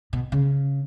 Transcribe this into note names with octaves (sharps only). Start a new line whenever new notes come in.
B2
C#3